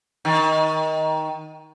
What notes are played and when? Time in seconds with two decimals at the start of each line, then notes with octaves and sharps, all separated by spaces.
0.25 D#3